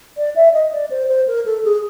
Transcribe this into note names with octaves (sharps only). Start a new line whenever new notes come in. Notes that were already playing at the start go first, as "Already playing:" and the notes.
D5
E5
D#5
D5
C5
C5
A#4
A4
G#4